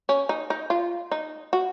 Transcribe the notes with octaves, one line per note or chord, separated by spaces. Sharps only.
C#4
D#4
D#4
F4
D#4
F#4